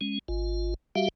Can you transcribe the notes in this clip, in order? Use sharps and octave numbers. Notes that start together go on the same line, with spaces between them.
G#3 C#4
G#1 F4
G3 F#4 G4 E5 F5